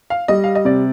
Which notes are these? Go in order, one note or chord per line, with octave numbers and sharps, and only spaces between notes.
F5
G3 D#5
F5
D#5
C3 D5